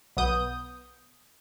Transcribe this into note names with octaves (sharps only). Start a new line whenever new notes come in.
B1 B3 D#6 G6